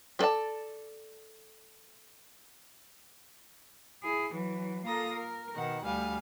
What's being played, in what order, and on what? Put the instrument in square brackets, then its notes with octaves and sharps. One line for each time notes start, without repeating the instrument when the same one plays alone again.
[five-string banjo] G3 A4 B4 D5 A5
[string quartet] E4 G#4
E3 F#3
A#3 F4 A4 A#5 D#6 A#6
A#4
B2 D#3 F#5
D2 G3 F5 G#5